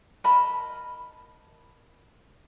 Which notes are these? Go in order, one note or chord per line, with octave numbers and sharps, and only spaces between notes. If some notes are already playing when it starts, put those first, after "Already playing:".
A#4 D#5 A5 B5